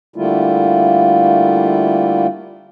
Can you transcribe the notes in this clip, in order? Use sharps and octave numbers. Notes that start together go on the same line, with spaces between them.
D3 G3 A3 A#3 E4 F4